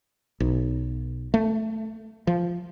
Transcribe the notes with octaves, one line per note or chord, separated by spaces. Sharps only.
B1
A3
F3